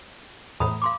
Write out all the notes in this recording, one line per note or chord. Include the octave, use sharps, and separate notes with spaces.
E2 A2 A#5 B5 D#6
F5 C6 D6